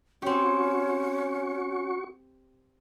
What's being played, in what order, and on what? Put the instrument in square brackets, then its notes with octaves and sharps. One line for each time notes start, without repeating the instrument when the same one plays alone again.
[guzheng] C4 G4 [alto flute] C#4 [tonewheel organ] F#4 C#6